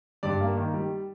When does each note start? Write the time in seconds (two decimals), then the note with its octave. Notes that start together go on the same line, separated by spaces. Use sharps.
0.23 G2 D5
0.40 A#3
0.57 D#3
0.74 G3